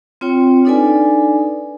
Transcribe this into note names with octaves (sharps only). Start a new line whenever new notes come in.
C4 F4 C#5 G5
D4 D#4 A4 B4 D5 G#5